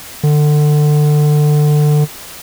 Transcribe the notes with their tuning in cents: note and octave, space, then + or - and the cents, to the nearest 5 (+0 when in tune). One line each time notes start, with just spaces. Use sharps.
D3 +25